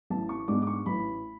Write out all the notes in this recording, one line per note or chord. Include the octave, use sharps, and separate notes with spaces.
A1 A5
C#6
G#2 G#3 B3 D4 D6
D6
C#6
A1 B5